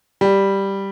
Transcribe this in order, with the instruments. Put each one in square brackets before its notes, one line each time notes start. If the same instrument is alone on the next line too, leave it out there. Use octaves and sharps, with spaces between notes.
[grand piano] G3